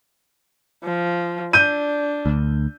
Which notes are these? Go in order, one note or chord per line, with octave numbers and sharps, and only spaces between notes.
F3
D4 G6 D#7
D2